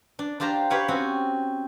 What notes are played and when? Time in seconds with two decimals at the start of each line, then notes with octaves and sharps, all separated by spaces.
0.19 D4
0.40 D4 F4 G4 C5 A#5
0.70 G4 B4 C#5 F5 F#5
0.88 C4 C#4 F#4